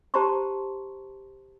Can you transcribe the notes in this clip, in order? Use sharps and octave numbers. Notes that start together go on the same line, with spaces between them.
G4 C5 A5 A#5 C6 C#6